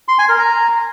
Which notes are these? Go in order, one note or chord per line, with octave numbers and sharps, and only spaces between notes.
C6
G#5
A#4
A#5